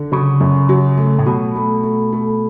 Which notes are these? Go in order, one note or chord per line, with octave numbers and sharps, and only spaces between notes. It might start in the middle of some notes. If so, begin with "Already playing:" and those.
Already playing: D3
C#3 F#3
F#2
F#3
A3
A2
B2 F#3
A3
A3
A3